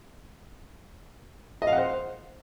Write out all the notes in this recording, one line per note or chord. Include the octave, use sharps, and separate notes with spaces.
D#5
F5
F#5
C5